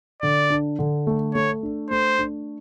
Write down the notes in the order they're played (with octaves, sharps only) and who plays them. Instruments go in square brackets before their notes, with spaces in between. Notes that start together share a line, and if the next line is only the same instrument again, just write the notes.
[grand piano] D3 [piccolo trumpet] D5
[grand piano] D4
D3
A3
[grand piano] A3 [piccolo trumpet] C#5
[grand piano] D4
[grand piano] A3 [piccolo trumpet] C5
[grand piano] D4